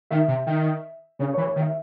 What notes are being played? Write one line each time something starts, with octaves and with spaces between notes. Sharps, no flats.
D#3 E5
C3
D#3
C#3 C#5
E3 C#5
C#5
D#3
E5